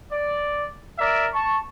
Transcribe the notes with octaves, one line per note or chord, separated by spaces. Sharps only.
D5
A#4 D5 E5
A5 C#6